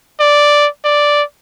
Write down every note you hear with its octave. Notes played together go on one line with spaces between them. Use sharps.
D5
D5